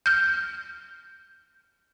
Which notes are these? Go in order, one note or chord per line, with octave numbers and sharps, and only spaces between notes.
F6 G6